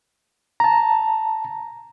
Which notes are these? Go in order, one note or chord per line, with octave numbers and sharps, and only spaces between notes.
A5 A#5